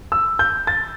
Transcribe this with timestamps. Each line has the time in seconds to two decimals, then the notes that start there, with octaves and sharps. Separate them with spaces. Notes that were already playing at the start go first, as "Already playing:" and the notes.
0.12 E6
0.39 G6
0.67 A6